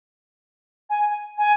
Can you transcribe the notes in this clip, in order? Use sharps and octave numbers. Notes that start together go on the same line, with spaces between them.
G#5
G#5